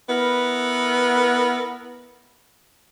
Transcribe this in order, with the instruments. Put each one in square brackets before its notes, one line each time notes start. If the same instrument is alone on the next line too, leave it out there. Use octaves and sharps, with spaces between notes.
[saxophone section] B3 E4 A#4 B4